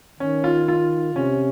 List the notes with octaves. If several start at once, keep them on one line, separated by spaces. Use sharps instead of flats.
D#3 C#4
F4
F4
C3 C#4